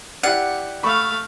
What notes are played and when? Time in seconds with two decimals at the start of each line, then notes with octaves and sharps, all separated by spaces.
0.23 E4 G4 D5 F#5
0.83 A3 F5 B5 C#6